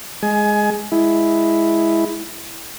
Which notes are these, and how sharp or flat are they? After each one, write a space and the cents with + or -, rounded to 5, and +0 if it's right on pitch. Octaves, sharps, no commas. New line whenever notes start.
G#3 +0 G#5 +20
G#3 +0 E4 +0